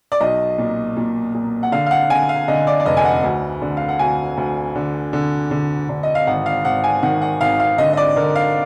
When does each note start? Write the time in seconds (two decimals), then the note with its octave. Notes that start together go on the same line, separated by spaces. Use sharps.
0.12 D5
0.20 B1 D#5
0.58 A#2
0.97 A#2
1.34 A#2
1.63 F#5
1.72 D3 F5
1.86 F5
1.91 F#5
2.10 D3 G#5
2.29 F5
2.48 D3 D#5
2.67 D5
2.80 D5
2.86 F1 D#5
2.97 G#5
3.05 F#5
3.23 D2
3.62 D3
3.77 F5
3.89 F#5
3.99 D2 G#5
4.37 D2
4.76 D3
5.13 D3
5.51 D3
5.89 D3
6.03 D#5
6.15 F5
6.27 G#1 F#5
6.46 F5
6.65 G#1 F#5
6.84 G#5
7.03 D#3 F#5
7.22 F#5
7.41 G#1 F5
7.60 F5
7.78 D3 D#5
7.93 D#5
7.97 D5
8.16 D3 A#4
8.36 F5